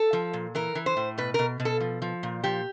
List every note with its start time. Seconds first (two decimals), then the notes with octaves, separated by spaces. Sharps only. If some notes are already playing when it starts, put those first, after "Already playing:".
Already playing: A4
0.13 F3
0.33 A#2
0.55 E3 A#4
0.75 E3
0.86 C5
0.97 A2
1.18 B2 B4
1.34 B2 A#4
1.60 B2
1.65 A4
1.80 F3
2.02 F3
2.23 A#2
2.44 F3 G4